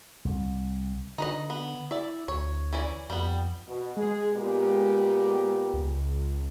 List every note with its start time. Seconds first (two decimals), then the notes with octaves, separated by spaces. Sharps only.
0.25 C2
1.18 D3 D#4 B4 D#5
1.50 B3
1.91 E4 D5 E5
2.28 D2 C#5
2.73 E3 C#4 D5
3.10 F2 G3 B3
3.67 B2
3.97 G#3 G#4
4.33 A#2 B3 G4
5.74 C#2